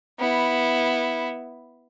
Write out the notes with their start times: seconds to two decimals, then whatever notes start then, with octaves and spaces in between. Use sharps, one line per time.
0.20 B3 E4